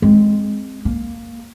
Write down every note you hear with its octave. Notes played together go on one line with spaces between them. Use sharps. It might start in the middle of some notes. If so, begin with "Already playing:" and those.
G#3 C4
A#3